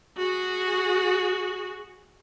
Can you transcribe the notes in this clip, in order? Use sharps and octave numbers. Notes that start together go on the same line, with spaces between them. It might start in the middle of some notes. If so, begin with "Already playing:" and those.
F#4 G#4